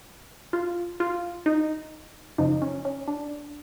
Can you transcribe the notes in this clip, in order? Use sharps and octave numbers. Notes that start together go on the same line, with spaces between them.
F4
F4
D#4
F#2 C#3 F3 D#4
C#4
C#4
D4